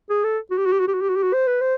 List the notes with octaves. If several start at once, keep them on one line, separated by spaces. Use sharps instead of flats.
G#4
A4
F#4
G4
F#4
G4
F#4
G4
F#4
G4
F#4
G4
F#4
C5
B4
C5